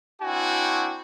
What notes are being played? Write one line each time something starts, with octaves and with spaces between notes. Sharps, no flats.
C4 D4 E4 F#4 G5 G#5